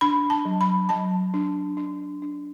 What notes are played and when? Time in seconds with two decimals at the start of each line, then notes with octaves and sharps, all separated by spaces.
0.01 D4 B5
0.30 A5
0.45 F#3
0.61 B5
0.89 F#3 A5
1.34 D4
1.77 D4
2.22 D4